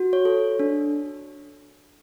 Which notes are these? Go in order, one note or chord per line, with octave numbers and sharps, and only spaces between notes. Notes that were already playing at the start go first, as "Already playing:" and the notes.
Already playing: F#4
C#5
A4
D4